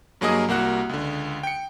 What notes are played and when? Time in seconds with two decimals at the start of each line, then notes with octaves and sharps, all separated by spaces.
0.21 G2 F#3 A#3 G#4 D#5 D#6
0.48 C2 A#3 F#4 F#6
0.89 C#2 D3
1.43 G5 C#7